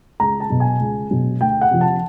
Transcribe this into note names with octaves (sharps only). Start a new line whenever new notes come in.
C#2 A#5
A5
B2 F#3
G#5
C#2
B2 F#3
D2 G5
F#5
C3 F3
A5